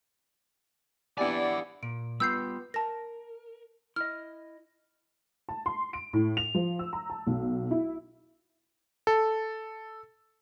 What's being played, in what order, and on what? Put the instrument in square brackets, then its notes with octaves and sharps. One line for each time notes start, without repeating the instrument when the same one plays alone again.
[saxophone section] E3 E4 D5 [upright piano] B3 D4 G4 [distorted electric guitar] F#5 G#5
[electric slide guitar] A#2 [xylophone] D7
[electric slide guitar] G3 B3 F4 [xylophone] E6 G6 C7
[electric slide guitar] A#4 [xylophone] A5 A#6
[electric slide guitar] E4 D#5 [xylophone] F6
[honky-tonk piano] A5
C6
D7
A2
F7
F3
E6
A#5
A5
B1
E4
[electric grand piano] A4